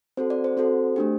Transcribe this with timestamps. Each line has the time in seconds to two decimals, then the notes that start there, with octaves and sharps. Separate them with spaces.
0.17 C4 F#4 A4 C5
0.30 D5
0.44 C5
0.57 C4 F#4 A4 C5
0.96 A3 D4 G4